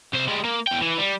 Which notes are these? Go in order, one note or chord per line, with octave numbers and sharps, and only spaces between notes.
C2 C5
G3 G#3
A#3
E2 G5
E3
G3